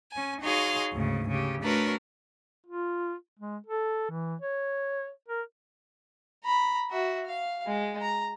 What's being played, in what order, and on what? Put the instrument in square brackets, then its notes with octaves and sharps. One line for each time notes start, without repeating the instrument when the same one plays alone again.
[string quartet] C#4 G#5
D#4 F#4 G#4 C#5 F5 C6
D2 G#2 C#3
C#3 G4
A3 D4 F#4 A#4 B4 C#5
[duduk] F4
G#3
A4
E3
C#5
A#4
[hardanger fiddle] A#5 B5
F#4 E5
F5
G#3
A#5